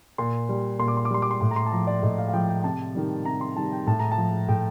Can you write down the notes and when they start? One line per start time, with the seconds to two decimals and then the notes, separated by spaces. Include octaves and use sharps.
0.18 A#2 C6
0.49 G3
0.79 A#2 C6
0.88 D6
0.97 C6
1.05 D6
1.10 G3 C6
1.22 D6
1.31 C6
1.41 A2 C6
1.51 A#5
1.56 C6
1.66 A5
1.72 F3 A#5
1.87 D5
2.03 A2 D#5
2.18 F5
2.28 F5
2.33 F3 G5
2.48 G5
2.64 C3 A5
2.95 D#3 G3
3.25 C3 A#5
3.41 C6
3.56 D#3 G3 A5
3.72 G5
3.87 A2 A5
3.99 A#5
4.12 A5
4.18 F3
4.48 A2 G5